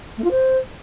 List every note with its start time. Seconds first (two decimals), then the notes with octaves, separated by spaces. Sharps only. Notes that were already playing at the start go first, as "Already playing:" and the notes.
0.17 A3
0.24 F4
0.30 C5